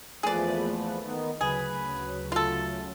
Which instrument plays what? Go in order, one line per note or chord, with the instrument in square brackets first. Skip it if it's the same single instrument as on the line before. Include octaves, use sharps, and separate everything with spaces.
[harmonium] E2 F3 [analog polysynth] A3 A#3 B4 [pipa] G#4 D5
[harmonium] D#3 B3 D#4
[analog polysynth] D2 C#3 F#3 [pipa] G#4 [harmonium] B4
[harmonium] A3 [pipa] F4 A4